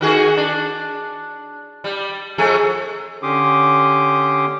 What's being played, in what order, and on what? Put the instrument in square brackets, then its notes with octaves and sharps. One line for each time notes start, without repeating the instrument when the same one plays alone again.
[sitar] D#3 F#4 G#4
D4
G3
F2 A3 G#4
[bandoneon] D3 C#4 G4 C6 D6 D#6